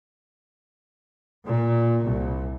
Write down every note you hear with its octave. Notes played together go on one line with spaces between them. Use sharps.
A#2
C2